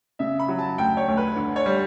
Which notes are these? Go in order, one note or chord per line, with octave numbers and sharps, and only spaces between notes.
C#3 E5
B5
F#3
A5
D2 G5
C#5
D2
B4
D3
C#5
G3